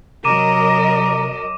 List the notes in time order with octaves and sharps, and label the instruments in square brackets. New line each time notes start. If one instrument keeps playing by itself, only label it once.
[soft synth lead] C3 [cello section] F#3 A#4 D#5 [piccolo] A#5 [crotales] D6 D#7 E7